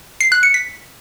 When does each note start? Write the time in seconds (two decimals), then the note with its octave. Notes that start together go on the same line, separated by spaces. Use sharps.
0.21 C7
0.32 F#6
0.43 C#7
0.54 B6